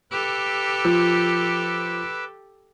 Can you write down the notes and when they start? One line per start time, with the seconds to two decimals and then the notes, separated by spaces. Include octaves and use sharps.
0.11 G4 A4 B4 D6 E6
0.85 F3